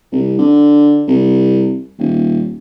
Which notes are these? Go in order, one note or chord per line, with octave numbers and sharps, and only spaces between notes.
C2
D3
C2
D#1